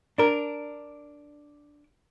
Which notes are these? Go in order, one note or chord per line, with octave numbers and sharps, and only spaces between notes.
D4 A#4